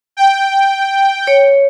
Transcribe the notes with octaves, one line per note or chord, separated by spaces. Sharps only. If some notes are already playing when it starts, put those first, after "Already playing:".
G5
C#5